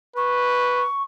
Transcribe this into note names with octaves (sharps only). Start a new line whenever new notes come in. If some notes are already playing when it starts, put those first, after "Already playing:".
B4 C#6